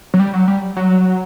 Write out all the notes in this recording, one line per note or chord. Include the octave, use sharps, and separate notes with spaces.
F#3
G3
F#3
G3
F#3